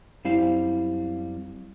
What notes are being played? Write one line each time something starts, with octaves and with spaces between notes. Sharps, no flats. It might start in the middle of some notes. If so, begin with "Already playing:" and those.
F#2 G3 C4 E4 C5 F5